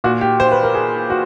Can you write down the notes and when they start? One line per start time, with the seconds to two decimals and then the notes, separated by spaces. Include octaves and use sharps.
0.04 A#2 F#4
0.21 G4
0.40 C5
0.51 B4
0.63 A#4
0.75 G#4
1.10 F#4